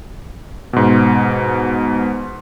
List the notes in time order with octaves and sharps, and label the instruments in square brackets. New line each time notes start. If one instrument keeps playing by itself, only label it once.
[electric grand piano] G#2 B2